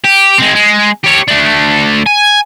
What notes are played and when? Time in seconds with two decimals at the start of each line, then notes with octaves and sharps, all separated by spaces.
0.04 G4
0.38 G#3 C4
0.55 G#3
1.04 G4 C#5
1.28 A3 D4
2.06 G#5